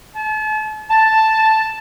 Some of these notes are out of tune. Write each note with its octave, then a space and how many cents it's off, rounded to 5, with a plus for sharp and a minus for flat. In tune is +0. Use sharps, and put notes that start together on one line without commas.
A5 -40
A5 +0